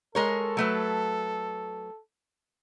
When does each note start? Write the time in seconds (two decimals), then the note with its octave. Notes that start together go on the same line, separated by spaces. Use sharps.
0.15 G#3 A4 A#4 C#5
0.57 F#3 A3 B4